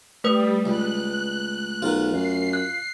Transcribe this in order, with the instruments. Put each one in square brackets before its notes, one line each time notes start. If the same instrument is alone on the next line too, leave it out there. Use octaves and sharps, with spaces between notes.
[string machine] G3 [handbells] A3 B4 D#6
[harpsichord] C#2 [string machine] F#6
[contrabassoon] B1 [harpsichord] F4 A#4
[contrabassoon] F#2 [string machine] C7
[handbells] F#6